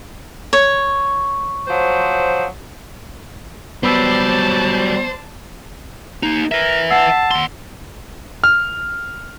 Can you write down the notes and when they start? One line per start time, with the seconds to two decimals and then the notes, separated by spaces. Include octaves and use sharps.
0.53 C#5
1.67 F3 F#3 C5
3.83 F#3 G3 B3 C5 D5 A5 B5 E6
6.23 A#3 D#4
6.52 A#4 B4 E5
6.91 F#5 A5 E6 C7
7.31 D#2 C6
8.44 F6